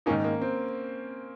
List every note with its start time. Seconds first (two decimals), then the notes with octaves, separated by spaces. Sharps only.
0.06 G#2 D#3 G#3 A#3 C#4 D#4
0.24 A#3
0.41 C4